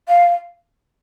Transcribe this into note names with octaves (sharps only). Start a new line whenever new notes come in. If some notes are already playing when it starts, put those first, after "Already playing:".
F5